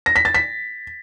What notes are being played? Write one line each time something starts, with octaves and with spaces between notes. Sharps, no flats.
A#6
B6
A6
B6